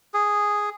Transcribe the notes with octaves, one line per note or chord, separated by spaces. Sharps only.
G#4